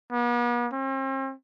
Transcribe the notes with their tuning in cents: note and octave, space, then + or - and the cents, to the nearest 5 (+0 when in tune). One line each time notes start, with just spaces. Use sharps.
B3 -45
C4 +45